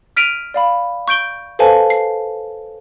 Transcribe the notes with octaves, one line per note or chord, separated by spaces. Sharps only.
F6 B6 D7 D#7 F7
D5 F5 B5
C#6 G6 D7 G7
A4 B4 C5 F5 G#5 A5
C7